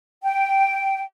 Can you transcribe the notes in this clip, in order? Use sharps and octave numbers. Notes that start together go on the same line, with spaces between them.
G5